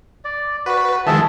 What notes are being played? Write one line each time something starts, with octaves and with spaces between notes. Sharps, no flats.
D5
F#4 B4
D#3 F3 G#3 G#4 E5 A5